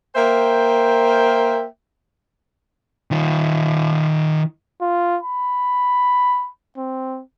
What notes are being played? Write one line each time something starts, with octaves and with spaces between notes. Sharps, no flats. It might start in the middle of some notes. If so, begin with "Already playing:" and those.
A#3 A#4 C5 E5 G5
D#3 F4
F4
B5
C4